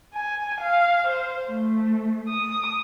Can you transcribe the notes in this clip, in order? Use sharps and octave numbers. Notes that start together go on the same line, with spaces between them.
G#5
F5
C5
A3
D#6